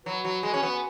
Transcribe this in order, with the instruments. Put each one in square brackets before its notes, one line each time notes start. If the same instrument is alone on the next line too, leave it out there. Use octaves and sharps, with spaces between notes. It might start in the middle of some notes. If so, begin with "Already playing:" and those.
[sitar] F#3 [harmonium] F#4 B4
[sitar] F#3
G#3
C#4
B3